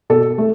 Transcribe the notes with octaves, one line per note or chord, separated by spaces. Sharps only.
B2 A4
A3